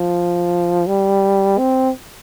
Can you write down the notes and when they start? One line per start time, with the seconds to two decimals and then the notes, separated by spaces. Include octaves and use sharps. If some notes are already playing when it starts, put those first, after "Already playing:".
Already playing: F3
0.87 G3
1.58 C4